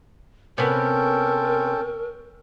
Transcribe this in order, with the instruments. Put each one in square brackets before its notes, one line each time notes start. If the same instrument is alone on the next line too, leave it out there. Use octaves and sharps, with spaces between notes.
[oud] C3 B3 [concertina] C#4 A4 G5 [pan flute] A#4